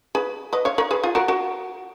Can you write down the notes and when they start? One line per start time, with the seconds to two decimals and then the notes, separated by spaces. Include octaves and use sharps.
0.15 G#4 B4
0.53 B4 D#5
0.65 C#5 F5
0.78 A#4 C#5
0.91 G#4 B4
1.03 F4 G#4
1.15 F#4 A#4
1.28 F#4 A#4